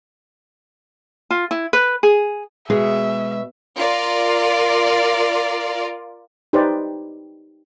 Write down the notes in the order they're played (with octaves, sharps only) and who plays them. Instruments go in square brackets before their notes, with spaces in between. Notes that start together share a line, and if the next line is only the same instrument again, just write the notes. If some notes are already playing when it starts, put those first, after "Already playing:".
[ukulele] F4
E4
B4
G#4
[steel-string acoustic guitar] B2 [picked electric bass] G#3 [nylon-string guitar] G#4 [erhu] E5
[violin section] F4 A#4 D5
[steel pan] D#4 G4 B4 C5 D5